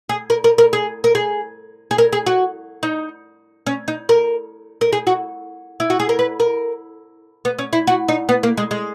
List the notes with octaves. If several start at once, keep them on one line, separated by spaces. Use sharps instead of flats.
G#4
A#4
A#4
A#4
G#4
A#4
G#4
G#4
A#4
G#4
F#4
D#4
C#4
D#4
A#4
A#4
G#4
F#4
E4
F#4
G#4
A#4
B4
A#4
B3
C#4
E4
F#4
D#4
B3
A#3
G#3
G#3